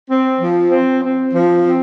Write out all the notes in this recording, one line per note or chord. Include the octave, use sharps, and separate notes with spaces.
C4
F3
C4
C4
F3
C4